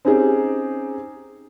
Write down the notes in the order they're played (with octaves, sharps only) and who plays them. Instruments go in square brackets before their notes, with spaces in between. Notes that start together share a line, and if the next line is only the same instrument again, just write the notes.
[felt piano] C4 C#4 D#4 G4 G#4